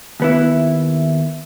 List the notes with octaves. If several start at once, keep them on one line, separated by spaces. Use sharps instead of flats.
D#2 B3 E4